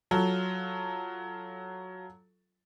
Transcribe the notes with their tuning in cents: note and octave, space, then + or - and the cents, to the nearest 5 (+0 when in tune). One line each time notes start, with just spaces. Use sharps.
F#3 +0 F4 +0 A4 +0